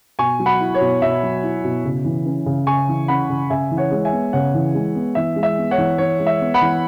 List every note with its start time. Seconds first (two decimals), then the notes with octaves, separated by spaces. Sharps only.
0.19 B2 G#5 C#6
0.39 F#3
0.46 F#5 B5
0.60 E4
0.74 C#5
0.81 B2
1.01 B2 E5
1.23 F#3
1.43 E4
1.64 B2
1.85 C#3
2.05 E3
2.25 C#4
2.46 C#3
2.67 C#3 G#5 C#6
2.88 E3
3.08 C#4 F#5 B5
3.30 C#3
3.50 C#3 E5 G#5
3.71 E3
3.77 C#5 F#5
3.91 G#3
4.05 E5 G#5
4.12 B3
4.33 C#3 C#5 F#5
4.54 E3
4.74 G#3
4.95 B3
5.15 E3 E5
5.36 G#3
5.43 E5
5.57 B3
5.71 C#5 F#5
5.78 E3
5.98 E3 C#5
6.19 G#3
6.27 E5
6.40 B3
6.54 F#5 B5
6.61 E3